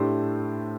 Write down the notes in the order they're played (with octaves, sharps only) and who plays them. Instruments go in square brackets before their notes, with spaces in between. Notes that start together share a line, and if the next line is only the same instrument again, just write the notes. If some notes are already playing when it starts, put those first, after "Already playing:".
Already playing: [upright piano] A2 A3 D4 G4 C5